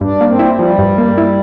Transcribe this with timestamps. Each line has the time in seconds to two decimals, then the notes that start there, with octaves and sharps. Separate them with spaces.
0.01 G2 D4
0.21 A#3
0.27 C4
0.39 E4
0.53 G3
0.59 F3
0.78 G2
0.98 A#3
1.18 E4